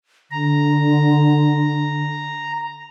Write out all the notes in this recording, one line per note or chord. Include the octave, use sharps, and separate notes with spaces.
D3 A#5